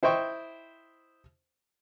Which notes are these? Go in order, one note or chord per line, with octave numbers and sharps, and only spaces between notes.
E4 C5 D#5 G5 C#6